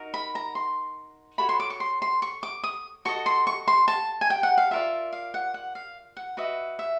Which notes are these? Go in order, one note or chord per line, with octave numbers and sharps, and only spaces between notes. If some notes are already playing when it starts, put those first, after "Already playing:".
Already playing: D#4 F#4 A#4
B5
A#5
C6
F#4 A4 C#5 B5
C6
D6
C#6
C6
C6
C#6
D6
D#6
F#4 A4 D#5 C#6
C6
C#6
C6
A5
G#5
G5
F#5
F5
F4 A#4 D5 E5
F5
F#5
F#5
F5
F#5
F#4 B4 D#5 E5
E5